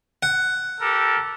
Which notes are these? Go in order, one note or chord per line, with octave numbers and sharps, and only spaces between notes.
F#5
G4 A4 A#4